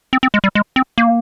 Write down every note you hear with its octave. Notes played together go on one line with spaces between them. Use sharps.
C4
C4
G#3
G3
G#3
C4
A#3